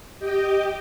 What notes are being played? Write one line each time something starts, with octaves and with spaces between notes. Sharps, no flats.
G4 D#5 G5